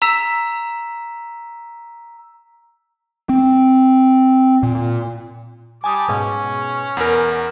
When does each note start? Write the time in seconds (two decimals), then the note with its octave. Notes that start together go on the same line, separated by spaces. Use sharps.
0.02 A#5 E6 B6 E7
3.29 C4
4.63 A#2
5.84 G3 G#5 A5 D6 D#6
6.08 G#2 B2 C#4 G#5
6.97 E2 A#4 F#5 B5